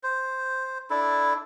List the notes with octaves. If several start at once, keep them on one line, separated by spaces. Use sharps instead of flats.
C5
D4 E4 A4